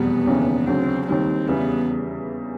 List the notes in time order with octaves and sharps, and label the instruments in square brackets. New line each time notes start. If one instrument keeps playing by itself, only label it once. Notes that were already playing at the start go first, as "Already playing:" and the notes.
Already playing: [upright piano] F1 E2 B2 G3 [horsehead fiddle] B3
[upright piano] F1 D#2 C#3 E3
[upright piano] D2 C#3 F#3 [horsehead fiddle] C4
[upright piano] D#2 D#3 G3 [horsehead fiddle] C4
[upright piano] E2 C#3 E3 G3 [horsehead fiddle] B3